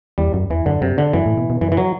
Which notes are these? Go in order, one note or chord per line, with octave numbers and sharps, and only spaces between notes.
E2 G3
F#2
E2 E3
F#2 D3
F#2 C3
D3
F#2 E3
A2
B2
B2
F#2 E3
E3
F#3